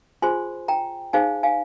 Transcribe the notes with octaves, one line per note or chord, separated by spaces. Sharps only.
F4 G#4 C5 G#5 C6
G5 A#5
D#4 G#4 C5 F5 G#5
F5 G#5